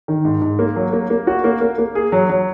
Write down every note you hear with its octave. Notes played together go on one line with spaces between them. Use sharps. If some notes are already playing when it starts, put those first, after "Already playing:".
D#3
G#2
G#2
A#3
F#3
A#3
A#3
F#4
A#3
A#3
A#3
G#4
F#3
F#3